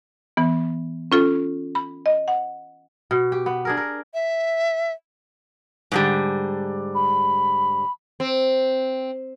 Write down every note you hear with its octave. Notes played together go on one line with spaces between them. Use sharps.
E3 B3
C#4 F4 A4
B5
D#5
F#5
B2
G4
B3
D4 G#4 A#4
A#4
E5
G#2 D3 G3
B5
C4